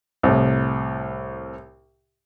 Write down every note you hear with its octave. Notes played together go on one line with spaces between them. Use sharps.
C2 A2